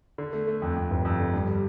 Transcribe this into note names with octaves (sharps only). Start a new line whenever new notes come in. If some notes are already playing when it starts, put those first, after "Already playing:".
D3
A3
A3
F2
F2
G1
F2
D3
G2
G3